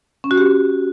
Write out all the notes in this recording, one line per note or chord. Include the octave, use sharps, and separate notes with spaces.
C#4
F#4
G4